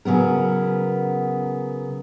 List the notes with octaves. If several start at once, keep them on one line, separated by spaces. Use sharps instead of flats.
C#3 F#3 B3 A#4